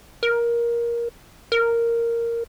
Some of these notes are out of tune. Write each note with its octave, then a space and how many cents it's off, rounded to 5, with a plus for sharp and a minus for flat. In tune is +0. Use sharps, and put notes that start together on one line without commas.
A#4 +15
A#4 -5